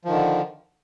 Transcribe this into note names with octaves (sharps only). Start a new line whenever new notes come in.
D3 D#3 F3